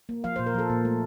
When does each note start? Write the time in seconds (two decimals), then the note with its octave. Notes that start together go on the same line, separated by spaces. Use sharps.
0.09 A#3
0.24 F3 F5
0.36 C5
0.39 A#2
0.46 A#4
0.54 F3 A4
0.70 A#2
0.85 A3